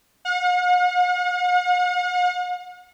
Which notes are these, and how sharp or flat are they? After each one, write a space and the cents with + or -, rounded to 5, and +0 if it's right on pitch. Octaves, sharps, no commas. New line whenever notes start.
F#5 -45